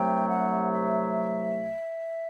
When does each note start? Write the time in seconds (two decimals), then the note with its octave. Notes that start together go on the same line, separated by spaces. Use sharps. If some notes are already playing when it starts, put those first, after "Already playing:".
Already playing: C2 C3 F#3 A3 G5
0.28 F#5
0.71 E5